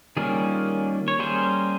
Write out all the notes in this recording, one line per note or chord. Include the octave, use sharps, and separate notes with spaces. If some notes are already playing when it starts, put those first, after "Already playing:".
D#3 G3 A#3 C#4 F4 G#4
C#5
G3 A#3 C#4 G#4 C5